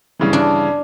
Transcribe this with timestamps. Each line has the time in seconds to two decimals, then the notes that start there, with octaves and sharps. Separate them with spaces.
0.19 G2 C#3 E3
0.33 D4